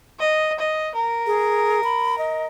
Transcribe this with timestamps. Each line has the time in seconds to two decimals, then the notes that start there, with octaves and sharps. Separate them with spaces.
0.19 D#5
0.59 D#5
0.94 A#4
1.27 G#4
1.84 B5
2.18 D#5